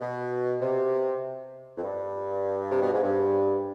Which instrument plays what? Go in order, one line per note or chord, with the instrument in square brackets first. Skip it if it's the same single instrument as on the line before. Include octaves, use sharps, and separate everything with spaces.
[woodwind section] B2
C3
F2
G2
C3
B2
G#2
G2